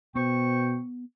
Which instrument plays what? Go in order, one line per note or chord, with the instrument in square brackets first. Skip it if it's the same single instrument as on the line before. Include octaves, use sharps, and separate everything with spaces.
[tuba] B2 [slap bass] B3 [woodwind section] C5 G5 C#6